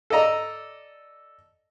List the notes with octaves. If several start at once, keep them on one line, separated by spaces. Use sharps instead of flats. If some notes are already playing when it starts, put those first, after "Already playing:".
A4 D5 D#5 A#5